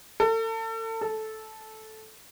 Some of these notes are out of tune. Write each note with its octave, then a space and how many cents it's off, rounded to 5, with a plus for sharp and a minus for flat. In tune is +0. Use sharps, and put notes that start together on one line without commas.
A4 +35
A4 -10